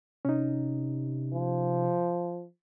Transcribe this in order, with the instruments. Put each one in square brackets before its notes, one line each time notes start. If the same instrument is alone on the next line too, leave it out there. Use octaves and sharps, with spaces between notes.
[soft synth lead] C3 [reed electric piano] C#4 D#4
[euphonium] F3